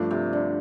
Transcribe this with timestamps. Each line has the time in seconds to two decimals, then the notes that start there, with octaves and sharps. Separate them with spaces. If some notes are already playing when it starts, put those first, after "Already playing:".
Already playing: G2 F3 A3 D4
0.11 C3
0.33 D3